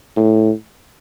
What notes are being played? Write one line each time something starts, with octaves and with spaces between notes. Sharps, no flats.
A2